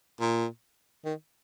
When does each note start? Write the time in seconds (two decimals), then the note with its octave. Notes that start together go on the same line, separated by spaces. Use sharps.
0.20 A#2
1.05 D#3